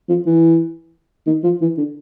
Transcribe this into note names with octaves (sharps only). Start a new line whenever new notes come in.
F3
E3
D#3
F3
E3
D3